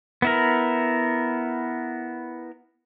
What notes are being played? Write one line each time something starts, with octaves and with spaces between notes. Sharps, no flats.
B3 E4 A#4